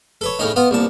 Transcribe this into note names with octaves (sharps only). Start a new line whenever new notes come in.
A4 B4 C#5
A2 C#3 C#4 D#4
B3 F4
C2 A#2 A5